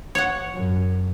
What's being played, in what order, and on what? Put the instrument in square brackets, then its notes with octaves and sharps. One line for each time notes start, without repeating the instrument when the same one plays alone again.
[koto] C#5 F#5
[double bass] F#2